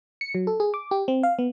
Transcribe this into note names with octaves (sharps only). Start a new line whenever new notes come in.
C#7
F#3
A4
G#4
D6
G4
C4
F5
B3